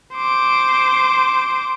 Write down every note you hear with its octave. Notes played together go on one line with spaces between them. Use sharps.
C5 D6